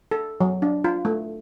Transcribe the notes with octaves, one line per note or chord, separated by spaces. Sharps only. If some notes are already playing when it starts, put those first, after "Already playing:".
A4
F#3
D4
F4
A3